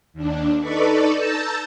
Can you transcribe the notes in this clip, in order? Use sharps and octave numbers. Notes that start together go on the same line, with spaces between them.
D#2 D4
D#4 A4 B4 D5 B5 C#6
A5 A#5 E6 G6 A6